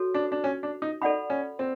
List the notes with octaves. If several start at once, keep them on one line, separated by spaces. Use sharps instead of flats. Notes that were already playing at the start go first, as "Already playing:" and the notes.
Already playing: F#4 A4 C#5
D4
D4
C#4
D4
D#4
D#4 A4 D5 F#5 B5
C#4
C4